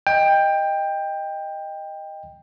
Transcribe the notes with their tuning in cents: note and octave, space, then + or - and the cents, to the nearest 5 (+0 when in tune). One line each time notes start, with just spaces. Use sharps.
D#5 +0 G5 +15